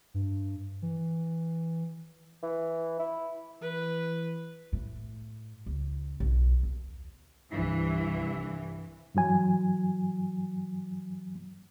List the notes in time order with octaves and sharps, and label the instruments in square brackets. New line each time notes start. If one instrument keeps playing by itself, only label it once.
[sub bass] G2
E3
[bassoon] E3
E4
[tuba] E3 [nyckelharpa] B4
[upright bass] A2
C#2
B1
D#2
[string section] C2 G2 E3
[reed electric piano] G2 E3 F#3 G#5